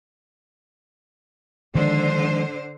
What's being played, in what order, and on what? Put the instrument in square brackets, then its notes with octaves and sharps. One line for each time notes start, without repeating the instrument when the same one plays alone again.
[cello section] D3 C5 [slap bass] D#3 F3 G#3